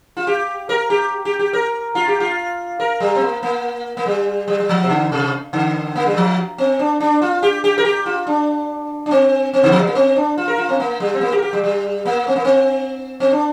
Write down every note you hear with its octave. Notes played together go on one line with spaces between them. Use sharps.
F4
G4
A#4
G4
G4
G4
A#4
F4
G4
F4
A#4
G3
C4
A#3
A#3
A#3
G3
G3
G3
F3
C3
D3
C3
D3
A#3
G3
F3
C4
D4
D4
F4
G4
G4
A#4
G4
F4
D4
D4
C4
C4
D3
F3
G3
A#3
C4
D4
F4
A#4
F4
C4
A#3
G3
C4
A#3
G4
A#4
G4
G3
G3
A#3
C4
A#3
C4
C4
D4